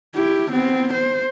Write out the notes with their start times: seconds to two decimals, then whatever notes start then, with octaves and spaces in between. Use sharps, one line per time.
0.15 E4 G4
0.51 B3 C4
0.94 C5